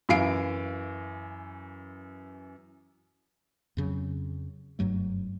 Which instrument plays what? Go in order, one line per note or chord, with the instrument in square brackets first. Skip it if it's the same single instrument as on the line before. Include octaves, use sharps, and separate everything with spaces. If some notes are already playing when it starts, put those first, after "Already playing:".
[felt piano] F#2 E3 F5 C7 D7
[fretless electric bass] F2 C#3 F#3
F#1 G2 F#3 A3